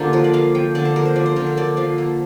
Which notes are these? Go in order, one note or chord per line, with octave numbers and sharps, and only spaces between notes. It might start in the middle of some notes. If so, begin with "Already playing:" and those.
Already playing: D3 A#3 D4 F4 G4 C5
F3 A#4
D5
A#3 F5
F3 G5
D3 D5
C5
A#3 A#4
C5
F3 D5
C5
D3 A#4
A#4
A#3 D5
F3 F5
A#3